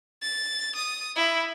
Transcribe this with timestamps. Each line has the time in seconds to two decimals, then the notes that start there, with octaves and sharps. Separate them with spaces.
0.22 A6
0.75 D#6
1.16 E4